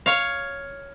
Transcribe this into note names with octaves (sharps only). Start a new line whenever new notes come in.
C#5 F5